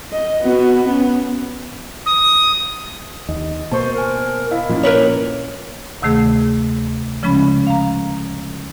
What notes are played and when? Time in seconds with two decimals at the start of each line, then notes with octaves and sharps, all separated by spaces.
0.12 D#5
0.42 B3 F#4
0.87 B3 C#4
2.06 D#6
3.29 D#2 D#5
3.72 B2 A#3 C5 A5 C#6
3.94 A#4 C5 G#5
4.51 E4 A#4 D#5 F5
4.69 A#2 F3 C#4
4.83 A#3 A#4 B4 C#5
6.02 D2 C3 D#3 A3 G#4
7.23 C#3 F3 G#3 C#4 B5
7.67 F5 A#5